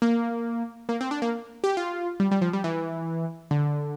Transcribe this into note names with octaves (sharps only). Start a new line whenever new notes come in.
A#3
A#3
C4
D4
A#3
G4
F4
G3
G3
F3
G3
E3
D3